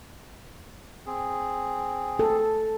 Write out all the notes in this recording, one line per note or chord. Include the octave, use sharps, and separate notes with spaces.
C4 G#4
A4